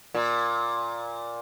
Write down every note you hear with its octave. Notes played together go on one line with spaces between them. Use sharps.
A#2